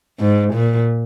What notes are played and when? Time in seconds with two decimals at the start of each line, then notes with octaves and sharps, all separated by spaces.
0.19 G#2
0.54 A#2